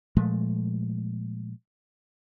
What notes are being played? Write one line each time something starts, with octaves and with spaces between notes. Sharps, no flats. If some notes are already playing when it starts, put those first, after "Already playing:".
A#2 F3 G#3 A3